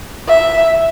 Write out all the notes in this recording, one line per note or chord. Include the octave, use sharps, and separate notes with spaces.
E5